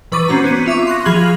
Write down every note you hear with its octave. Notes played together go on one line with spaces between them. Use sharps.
E3 B4 C#6 D6 A6 D#7
C4 C#4 F#4 A#5
B3 C#4 D#7
F4 E5 C#6 D6
C6 F#6 A#6
F3 F4 G#4 B5 G#6 F#7